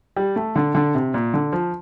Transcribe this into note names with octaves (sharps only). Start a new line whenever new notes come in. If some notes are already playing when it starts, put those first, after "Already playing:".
G3
A3
D3
D3
C3
A#2
D3
F3